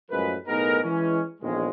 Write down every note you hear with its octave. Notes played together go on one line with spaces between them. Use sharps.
F#2 A2 F3 G#3 A#4 B4
B1 A2 B3 D#4 G#4 A#4
E3 G#3 C#4
A#1 E2 A2 D#3 G#3